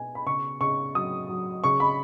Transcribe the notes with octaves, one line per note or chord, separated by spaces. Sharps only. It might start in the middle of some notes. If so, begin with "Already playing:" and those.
Already playing: B2 B3 G#5
B5
C#3 C#6
C#3 C#6
F#3 D#6
F#3
C#3 C#6
B5